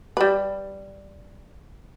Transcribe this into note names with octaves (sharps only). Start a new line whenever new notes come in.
G3 B4